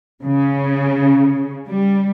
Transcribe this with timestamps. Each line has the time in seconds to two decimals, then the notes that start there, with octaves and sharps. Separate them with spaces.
0.22 C#3
1.68 G3